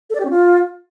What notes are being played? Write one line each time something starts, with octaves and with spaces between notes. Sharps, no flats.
A4
D5
G4
C#4
F4